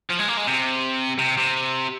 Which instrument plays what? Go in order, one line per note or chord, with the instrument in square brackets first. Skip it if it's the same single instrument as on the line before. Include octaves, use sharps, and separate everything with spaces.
[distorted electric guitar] F3
G#3
A#3
G#3
C3
C3
C3